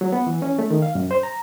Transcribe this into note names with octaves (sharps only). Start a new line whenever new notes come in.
F#3
B3
E3
C#4
A3
D#3
F5
F#2
C5
A#5